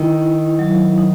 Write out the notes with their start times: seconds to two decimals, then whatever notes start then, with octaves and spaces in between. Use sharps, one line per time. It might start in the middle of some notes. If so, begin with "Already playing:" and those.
Already playing: D#3 E4
0.20 D#4
0.59 F#3
0.98 D#4